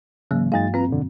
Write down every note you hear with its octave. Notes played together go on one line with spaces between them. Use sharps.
G#2 C#3 E3 F#3 A#3
G2 G#3 D#4 F5 A6
C4 F4 B4 A#5
F2 B2 D3